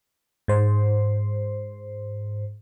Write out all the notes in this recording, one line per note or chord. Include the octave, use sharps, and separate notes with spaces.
G#2 C5